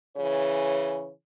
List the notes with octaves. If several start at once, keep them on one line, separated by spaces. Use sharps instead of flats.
C#3 E3 C#5